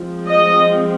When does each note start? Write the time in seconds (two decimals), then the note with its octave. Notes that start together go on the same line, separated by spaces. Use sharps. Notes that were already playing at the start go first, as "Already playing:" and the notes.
Already playing: F3 G#3 C4
0.26 D#5